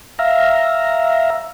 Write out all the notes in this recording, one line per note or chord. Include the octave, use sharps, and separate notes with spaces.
E5 F5 A#5